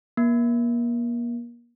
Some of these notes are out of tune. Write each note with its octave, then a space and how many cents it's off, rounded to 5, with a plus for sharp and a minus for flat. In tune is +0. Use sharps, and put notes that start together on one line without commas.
A#3 +35